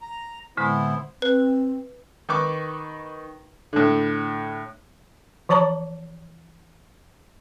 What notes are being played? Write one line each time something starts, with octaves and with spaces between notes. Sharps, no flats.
A#5
A2 D3 G#3 B3 C4 E4
C4 B4
D#3 D#4 B4 C#6 D6
A2 D3
E3 F3 C#5 A5 A#5 D6